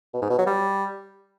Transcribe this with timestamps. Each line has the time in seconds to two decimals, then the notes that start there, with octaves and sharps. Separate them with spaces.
0.14 B2
0.22 G#2
0.30 B2
0.38 F#3
0.46 G3